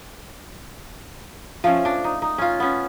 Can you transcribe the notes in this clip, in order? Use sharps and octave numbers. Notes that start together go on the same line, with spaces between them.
F3 A3 C#4
D4
D#4
D#4
C#4 F4
B3 C#4